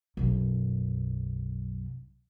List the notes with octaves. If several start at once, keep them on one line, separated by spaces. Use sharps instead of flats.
B1 F#2